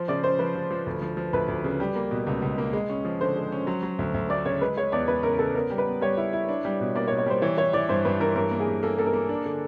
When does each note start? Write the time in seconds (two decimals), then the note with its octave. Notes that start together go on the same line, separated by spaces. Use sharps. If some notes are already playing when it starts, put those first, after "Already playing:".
Already playing: F3 C5
0.08 C#3 D5
0.23 C#4 C5
0.39 F3 B4
0.55 F3
0.71 F3
0.87 D2
1.02 F3
1.17 F3
1.33 D2 B4
1.48 D2
1.64 C#3
1.80 G3
1.96 A#3
2.11 B2
2.27 C#2
2.42 C#2
2.58 A#3
2.73 G#3
2.89 C#4
3.05 F3
3.20 D3 C5
3.36 G#3
3.52 C#4
3.67 F#3
3.83 F#3
3.99 D2
4.14 D2
4.29 A3 D5
4.45 C#3 C#5
4.61 G#3 B4
4.76 G#3 C#5
4.92 E2 D5
5.08 G#3 B4
5.23 C#3 A#4
5.39 C#3 A4
5.55 B3 A#4
5.70 G3
5.78 B4
5.86 B3
6.01 G3 C#5
6.17 E4
6.33 E4
6.48 D4
6.65 G3
6.80 B2
6.96 A#3 D5
7.08 C#5
7.11 B2
7.18 C#5
7.26 G3 C5
7.42 E3 C#5
7.57 E3 C#5
7.73 E3 D5
7.89 G2 C5
8.05 G2 B4
8.20 E3 A#4
8.36 G2 A#4
8.51 A#3
8.60 G#4
8.67 G2
8.83 A#3 A4
8.98 A#3 A4
9.06 A#4
9.14 A#3
9.29 D4
9.46 D3